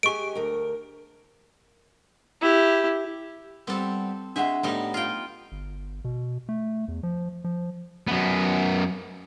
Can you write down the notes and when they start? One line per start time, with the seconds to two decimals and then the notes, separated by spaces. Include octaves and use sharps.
0.03 G#3 G4 G#5 C#6 D7
0.35 D2 A#4
2.41 E4 G4
3.67 G3 B3 C4 G4 A4
4.36 G#3 D4 F#4 E5 F#5
4.63 A2 G3 B3 D#4 C6
4.94 F4 G5
5.52 G1
6.05 B2
6.49 A3
6.88 E2
7.03 F3
7.44 F3
8.07 F#2 B3